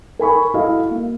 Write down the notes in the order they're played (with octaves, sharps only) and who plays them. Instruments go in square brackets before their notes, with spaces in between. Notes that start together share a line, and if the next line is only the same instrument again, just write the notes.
[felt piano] A#4 G#5 B5 C#6
E4 F#4 A4 D#5 F5
A#3